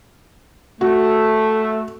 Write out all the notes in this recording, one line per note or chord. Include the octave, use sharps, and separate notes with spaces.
A3 F#4